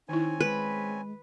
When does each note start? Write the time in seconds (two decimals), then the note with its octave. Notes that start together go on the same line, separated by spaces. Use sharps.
0.09 D#3 C4 C#4 D#4 E4 G#5
0.41 G#3 B4